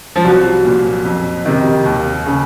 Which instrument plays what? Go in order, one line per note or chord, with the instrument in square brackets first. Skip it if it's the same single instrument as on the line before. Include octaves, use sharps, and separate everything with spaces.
[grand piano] F3
C2 F#3
A#2
F2
C3 D#3
D#2
C#3